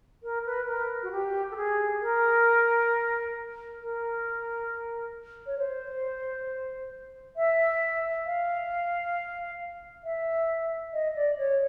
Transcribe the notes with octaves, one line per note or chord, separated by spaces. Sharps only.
A#4
B4
A#4
F#4
G4
A4
G#4
A#4
A#4
C#5
C5
E5
F5
E5
D#5
D5
C#5